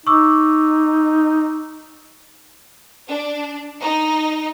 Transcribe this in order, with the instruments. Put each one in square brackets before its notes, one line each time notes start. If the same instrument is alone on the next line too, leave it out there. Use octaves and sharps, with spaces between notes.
[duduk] D#4 [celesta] C#6 D6 E6
[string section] D4
D#4